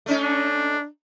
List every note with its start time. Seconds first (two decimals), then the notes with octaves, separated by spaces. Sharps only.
0.06 A3 C#4 D#4
0.21 D4